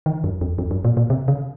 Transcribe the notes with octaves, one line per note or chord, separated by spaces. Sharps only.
D#3
F#2
F2
F2
F#2
A#2
A#2
C3
C#3